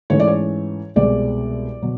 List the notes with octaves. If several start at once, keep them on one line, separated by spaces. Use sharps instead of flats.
G#2 E3 A3 C#4 C#5
D5
C#5
C2 B2 G#3 C4 D5
B2 F#3